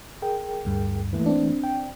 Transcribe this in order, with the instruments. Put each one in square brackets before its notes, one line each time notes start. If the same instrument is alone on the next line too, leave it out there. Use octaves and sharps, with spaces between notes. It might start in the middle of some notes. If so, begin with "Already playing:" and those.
[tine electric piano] G#4 A#4 G5
[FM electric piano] D2 G2
[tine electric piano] E3 A3 A#3
[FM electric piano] C4 D4
[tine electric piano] G5